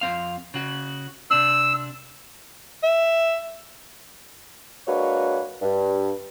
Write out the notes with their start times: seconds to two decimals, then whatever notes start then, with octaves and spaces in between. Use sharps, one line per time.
0.01 F2 C4 F5
0.54 C#3 F#4
1.31 C3 D4 E6
2.83 E5
4.87 G#3 A#3 D4 F#4 B4 C#5
5.61 G2